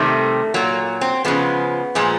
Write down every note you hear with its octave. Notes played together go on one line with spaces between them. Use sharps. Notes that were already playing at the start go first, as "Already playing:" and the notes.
Already playing: C3 D#3 G3 A3
A#2 F#3 A#3
C4
C#3 F3 G#3 B3
A#2 F3 G#3